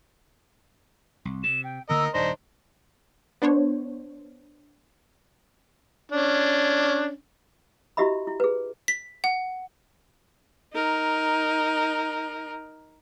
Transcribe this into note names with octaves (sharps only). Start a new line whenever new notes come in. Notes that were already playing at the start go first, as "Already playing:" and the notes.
C2
C3 E7
G5
D2 D3 A#3 A#4 D#5 E6
D#1 G2 D4 D#4 C5 A#6
B3 D4 C5 C#5
C#4 D4
E4 F#4 G4 D#5 E5 B5
E4
G#4 B4
B6
F#5
D#4 A#4